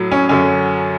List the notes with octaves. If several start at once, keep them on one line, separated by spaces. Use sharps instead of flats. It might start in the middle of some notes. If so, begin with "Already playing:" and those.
Already playing: A2 F#3
C#4
F#2 D3 F#3 C#4